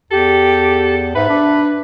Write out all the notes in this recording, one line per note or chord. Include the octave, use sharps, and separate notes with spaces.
E2 G4 A4
G#2 B4 E5
D4